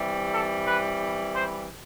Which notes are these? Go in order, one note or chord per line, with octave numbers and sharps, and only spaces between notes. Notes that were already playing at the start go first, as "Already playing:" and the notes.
Already playing: C3 E3 G3
A4
B4
C5